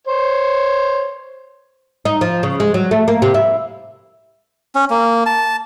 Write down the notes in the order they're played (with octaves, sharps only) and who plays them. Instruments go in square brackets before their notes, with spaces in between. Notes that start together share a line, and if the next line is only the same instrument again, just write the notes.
[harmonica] C5 C#5
[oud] D#4
F3
C#3
G#3
F#3
A3
A#3
C3
E4
[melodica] C#4
A#3
A5